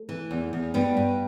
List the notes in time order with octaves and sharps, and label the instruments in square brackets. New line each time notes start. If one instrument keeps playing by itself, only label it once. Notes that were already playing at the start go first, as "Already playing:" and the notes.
Already playing: [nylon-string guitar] A3
E3
E2
E2
G2 G3 B3
G2